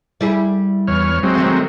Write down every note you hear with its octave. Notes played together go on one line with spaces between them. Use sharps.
G3 E4 G#4
E2 C#5 F6
F#3 G#3 C4
D#3 A3